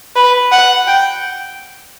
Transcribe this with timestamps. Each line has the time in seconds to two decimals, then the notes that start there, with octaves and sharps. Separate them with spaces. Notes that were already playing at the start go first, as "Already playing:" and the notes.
0.16 B4
0.52 F#5
0.88 G5